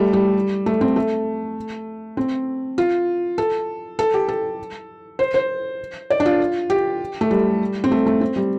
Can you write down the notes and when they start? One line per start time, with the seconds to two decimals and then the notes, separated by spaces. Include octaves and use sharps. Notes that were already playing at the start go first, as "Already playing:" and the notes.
Already playing: G3 A3
0.13 G3
0.66 A3
0.81 C4
0.96 A3
2.17 C4
2.78 F4
3.38 A4
3.99 A4
4.14 G4
4.28 A4
5.19 C5
5.34 C5
6.10 D5
6.20 D4
6.26 F4
6.70 G4
7.21 A3
7.31 G3
7.84 C4
7.91 A3
8.06 A3
8.21 C4
8.36 G3